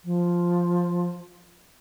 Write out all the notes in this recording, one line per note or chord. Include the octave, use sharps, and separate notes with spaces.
F3